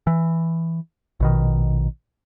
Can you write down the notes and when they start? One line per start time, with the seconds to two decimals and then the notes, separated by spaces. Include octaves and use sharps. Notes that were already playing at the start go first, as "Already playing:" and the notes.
0.07 E3
1.20 A#1 B2 D#3